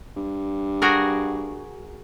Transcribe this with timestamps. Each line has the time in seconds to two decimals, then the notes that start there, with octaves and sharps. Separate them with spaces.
0.16 G2
0.82 F#4 G#4 A#4